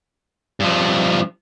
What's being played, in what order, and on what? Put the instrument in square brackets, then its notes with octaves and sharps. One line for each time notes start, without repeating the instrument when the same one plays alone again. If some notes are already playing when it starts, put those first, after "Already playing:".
[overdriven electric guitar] G2 F3